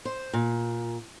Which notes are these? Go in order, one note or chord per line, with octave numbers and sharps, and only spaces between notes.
C5
A#2